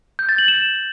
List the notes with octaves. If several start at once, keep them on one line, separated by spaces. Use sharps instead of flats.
G6
A6
F#7
E7